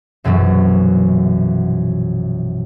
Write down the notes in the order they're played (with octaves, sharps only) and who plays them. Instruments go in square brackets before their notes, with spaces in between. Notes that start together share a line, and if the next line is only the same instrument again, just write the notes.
[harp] A#1 F#2 B2 E3 F#3